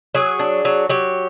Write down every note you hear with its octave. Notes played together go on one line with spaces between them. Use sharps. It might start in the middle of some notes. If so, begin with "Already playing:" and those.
F#3 G#4
D4
F#3
F#3 G4